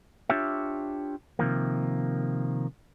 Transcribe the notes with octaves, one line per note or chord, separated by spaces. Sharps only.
D4 F4 G4 C#5 E5
C3 D#3 F3 A#3